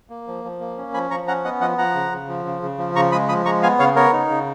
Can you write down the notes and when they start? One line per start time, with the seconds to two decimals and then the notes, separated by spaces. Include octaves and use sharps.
0.10 A#3
0.28 F3
0.44 F3
0.60 A#3
0.77 C#4
0.94 F3 G#5 B5
1.11 F3 A#5 C#6
1.28 C#4 F#5 A#5
1.44 B3 D#5 F#5
1.61 F3 D#5 F#5
1.78 F3 F#5 A#5
1.95 C#3
2.12 C#3
2.28 F3
2.45 C#3
2.62 C#3
2.78 F3
2.95 C#3 A#5 C#6
3.12 G#3 B5 D#6
3.28 F3 B5 D#6
3.45 G#3 A#5 C#6
3.63 B3 F5 G#5
3.79 C#3 C#5 F5
3.96 B3 A#4 C#5
4.13 D#4
4.30 C#3